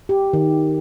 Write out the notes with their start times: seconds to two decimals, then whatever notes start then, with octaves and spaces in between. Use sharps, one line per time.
0.09 G4
0.33 D#3